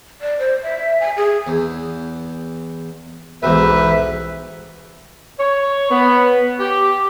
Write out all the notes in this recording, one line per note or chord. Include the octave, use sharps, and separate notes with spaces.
D5
C5
E5
G#5
G#4
E2
B1 E2 G#2 B4 E5
C#5
B3
G4